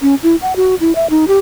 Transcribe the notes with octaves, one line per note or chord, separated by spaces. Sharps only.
C#4
E4
F#5
F#4
E4
E5
D#4
G4